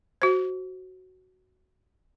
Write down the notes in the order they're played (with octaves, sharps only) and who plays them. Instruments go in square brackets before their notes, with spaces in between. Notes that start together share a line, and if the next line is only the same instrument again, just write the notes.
[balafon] F#4 C5